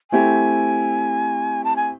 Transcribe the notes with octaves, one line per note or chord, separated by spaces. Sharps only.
A3 C4 E4 G4 G#5
A5
G#5